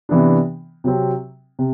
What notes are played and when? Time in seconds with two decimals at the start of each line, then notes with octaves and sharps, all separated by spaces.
0.09 C3 E3 B3 D4
0.84 C3 F#3 C4
1.59 C3